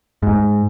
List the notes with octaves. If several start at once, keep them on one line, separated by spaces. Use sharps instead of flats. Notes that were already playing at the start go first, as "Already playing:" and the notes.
G#2